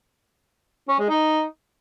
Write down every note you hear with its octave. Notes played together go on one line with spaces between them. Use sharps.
C#4
G#3
D#4